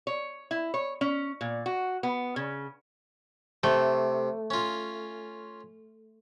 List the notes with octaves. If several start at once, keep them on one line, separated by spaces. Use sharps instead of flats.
C#5
E4
C#5
C#4
A#2
F#4
B3
C#3
C3 A3
C#4 F4